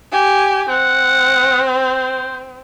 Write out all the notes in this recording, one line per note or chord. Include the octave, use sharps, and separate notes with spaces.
G4 G#5
C4 F#5
C5